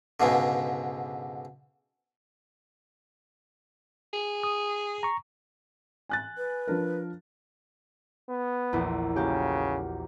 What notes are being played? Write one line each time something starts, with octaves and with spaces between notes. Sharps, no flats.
C#2 G#2 B2 D3
G#4
D#6
A#5 C#6
G#5 F#6 A6
B4
F3 D4 A#4
B3
A#1 E2 E4
C#3 A#3 F#4 G4